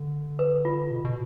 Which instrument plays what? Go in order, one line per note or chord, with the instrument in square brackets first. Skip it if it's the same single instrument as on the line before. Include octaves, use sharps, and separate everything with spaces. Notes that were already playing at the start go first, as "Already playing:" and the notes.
Already playing: [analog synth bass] D3
[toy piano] B4
F4
[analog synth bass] B2
B2